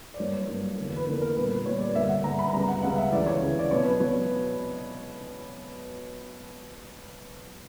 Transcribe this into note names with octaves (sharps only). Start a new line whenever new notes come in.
D5
G2 F#3 A#3 C#5
C#5
G2 F#3 A#3
E2 D3 A#3
B4
E2 D3 A#3 A#4
A#4
A#2 G3 B3 B4
B4
A#2 G3 B3 C#5
D5
G2 D3 A#3 E5
F#5
G2 D3 A#3 A#5
B5
C#2 C#3 G3 B3 A#5
F#5
C#2 C#3 G3 B3 F#5
E5
D2 C#3 E3 D5
C#5
D2 C#3 E3
D5
B2 F#3 B3 C#5
B4
B2 F#3 C#5